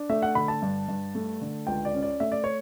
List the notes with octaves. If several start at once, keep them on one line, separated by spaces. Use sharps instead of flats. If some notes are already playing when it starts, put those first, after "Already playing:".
Already playing: D4
A3 E5
F#5
D3 B5
A5
G2
G2
A3
D3
C#2 G5
D5
C#4
D5
A3 E5
D5
C#5